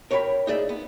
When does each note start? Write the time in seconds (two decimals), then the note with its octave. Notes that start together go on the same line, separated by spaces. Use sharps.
0.11 A#4 C#5 G5 G#5 B5
0.47 D#4 G#4 D5 E5
0.69 B3